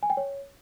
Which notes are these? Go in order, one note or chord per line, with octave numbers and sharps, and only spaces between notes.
G#5
G5
C#5